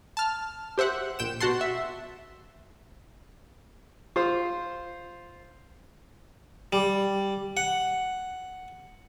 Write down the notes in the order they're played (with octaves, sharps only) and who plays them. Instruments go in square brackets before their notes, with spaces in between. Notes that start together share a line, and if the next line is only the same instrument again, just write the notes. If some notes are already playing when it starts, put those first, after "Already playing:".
[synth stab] A5 F6
G4 C5 E5 F#5
A#1 G5 E7
B2 F#4 F#5 A5 C6
E5
[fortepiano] F4 C5
[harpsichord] G3
F#5